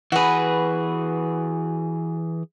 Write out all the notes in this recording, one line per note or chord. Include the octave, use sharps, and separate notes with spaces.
E3 F#4 G#4 B4